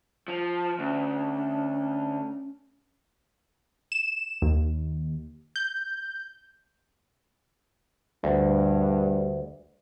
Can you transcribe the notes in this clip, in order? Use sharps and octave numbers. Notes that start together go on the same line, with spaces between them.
F3
D2 C#4
E7
D#2
G6
D2 G2